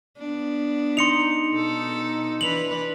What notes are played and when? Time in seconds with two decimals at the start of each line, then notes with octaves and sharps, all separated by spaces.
0.18 B3 D4
0.97 D#4 C6 C#7 F7
1.52 B2 A4
2.41 E3 D4 B4 F7 F#7